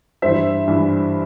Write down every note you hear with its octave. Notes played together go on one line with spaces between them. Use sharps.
G2 E3 C5 E5
G2 E3